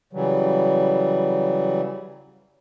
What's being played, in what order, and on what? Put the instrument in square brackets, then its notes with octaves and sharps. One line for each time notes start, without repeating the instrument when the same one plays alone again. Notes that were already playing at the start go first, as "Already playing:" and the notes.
[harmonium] C#3 E3 F#3 G3